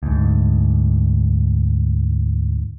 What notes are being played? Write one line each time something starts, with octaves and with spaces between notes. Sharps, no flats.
D2 G#2